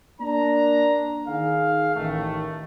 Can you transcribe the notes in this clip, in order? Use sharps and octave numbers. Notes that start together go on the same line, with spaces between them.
A#3 D4 A#5
D#3 D#4 G#4 F5
A1 D#3 A3